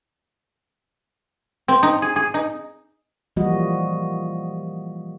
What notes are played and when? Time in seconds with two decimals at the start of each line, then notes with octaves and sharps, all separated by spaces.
1.68 C4
1.83 D#4
2.02 G#4
2.16 G#4
2.34 D#4
3.36 E3 F3 G3 A#3 F#4 D#5